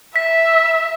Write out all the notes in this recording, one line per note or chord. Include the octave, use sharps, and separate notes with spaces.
E5 B6